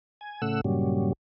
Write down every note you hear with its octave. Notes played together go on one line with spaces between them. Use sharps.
G#5
A2 C#3 A3 F#5 E6
G2 A#2 C#3 F#3 G3